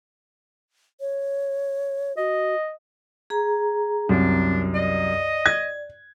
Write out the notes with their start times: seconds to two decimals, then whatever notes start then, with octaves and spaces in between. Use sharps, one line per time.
1.00 C#5
2.17 F#4 D#5
3.30 G#4 A#5
4.09 C2 F#2 C4 D4
4.74 D5 D#5
5.46 G#6